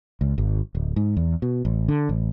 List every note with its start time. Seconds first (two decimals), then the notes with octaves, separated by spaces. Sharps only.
0.21 C#2
0.38 G#1
0.75 D1
0.96 G#2
1.17 E2
1.42 B2
1.65 A1
1.88 D3
2.09 A1